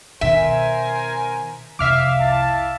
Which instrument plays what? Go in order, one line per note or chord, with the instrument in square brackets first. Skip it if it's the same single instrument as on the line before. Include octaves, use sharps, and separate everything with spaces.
[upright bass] B2 D#3 [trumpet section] A#4 C5 G#5 [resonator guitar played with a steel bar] E5
[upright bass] C2 F2 [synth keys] E5 F5 D6
[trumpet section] E4 A5